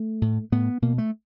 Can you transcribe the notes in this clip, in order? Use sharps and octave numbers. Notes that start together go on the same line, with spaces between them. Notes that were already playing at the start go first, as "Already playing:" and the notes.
Already playing: A3
A2
A2 B3
B2 A#3
A3